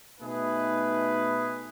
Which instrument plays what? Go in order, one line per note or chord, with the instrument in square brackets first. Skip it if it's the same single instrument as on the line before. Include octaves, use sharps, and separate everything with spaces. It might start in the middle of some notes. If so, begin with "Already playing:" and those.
[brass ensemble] B2 A3 D#4 G#4 B4